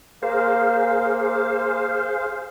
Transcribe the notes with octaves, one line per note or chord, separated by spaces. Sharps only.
A#3 G#4 C5 F5